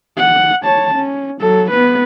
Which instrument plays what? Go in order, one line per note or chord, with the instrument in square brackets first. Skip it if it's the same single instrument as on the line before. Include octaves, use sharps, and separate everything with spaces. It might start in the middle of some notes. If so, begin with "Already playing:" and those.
[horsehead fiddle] F#5
C#5 A5
C#4
F#3 A4
B3 B4